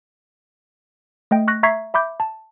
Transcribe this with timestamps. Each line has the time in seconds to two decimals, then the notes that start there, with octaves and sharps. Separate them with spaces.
1.31 A3 D#5 G5
1.48 C#6 F#6 A#6
1.63 E5 A#5 C#6 G#6 B6 C7
1.94 E5 B5 D6 G6
2.20 A5